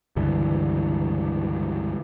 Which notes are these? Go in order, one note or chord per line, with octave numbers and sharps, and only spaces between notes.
C#2 G2 D3 E3